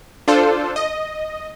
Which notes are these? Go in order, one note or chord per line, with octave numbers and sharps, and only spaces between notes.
D4 F4 A4 C5
D#5